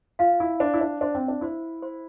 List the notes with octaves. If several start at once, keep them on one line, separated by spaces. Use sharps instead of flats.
F4 F5
E4
D4 C5
E4
D4
D4 C5
C4
D4
E4 C5
C5